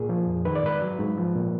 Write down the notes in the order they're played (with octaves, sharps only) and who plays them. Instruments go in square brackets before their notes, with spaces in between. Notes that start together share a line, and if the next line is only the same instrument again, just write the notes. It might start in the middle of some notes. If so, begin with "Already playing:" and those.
Already playing: [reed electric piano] A#2 G#4
F3
F2
D#3 B4
D5
G#2 B4
F#3
G#2
F3
A#2